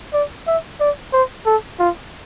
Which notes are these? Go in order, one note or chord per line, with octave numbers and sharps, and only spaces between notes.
D5
E5
D5
C5
A4
F4